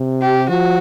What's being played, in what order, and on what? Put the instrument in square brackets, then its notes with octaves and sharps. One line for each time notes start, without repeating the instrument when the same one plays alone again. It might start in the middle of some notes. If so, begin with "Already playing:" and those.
Already playing: [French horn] C3
[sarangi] G4
[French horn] F3 [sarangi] F#4